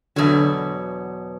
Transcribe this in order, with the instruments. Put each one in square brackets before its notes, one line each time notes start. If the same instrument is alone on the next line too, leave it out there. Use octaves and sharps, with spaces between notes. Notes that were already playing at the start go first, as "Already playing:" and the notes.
[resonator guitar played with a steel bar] E2 B2 F#3 [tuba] D3